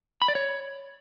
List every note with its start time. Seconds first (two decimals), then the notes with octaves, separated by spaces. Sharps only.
0.22 B5
0.28 D5
0.35 C#5